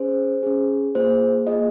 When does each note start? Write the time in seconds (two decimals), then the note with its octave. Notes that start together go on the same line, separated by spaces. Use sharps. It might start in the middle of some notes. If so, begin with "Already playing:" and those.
Already playing: C#4 G#4 C5
0.43 C#4 G#4
0.95 A#3 F4 G#4 C5
1.47 A#3 F4 G#4 D#5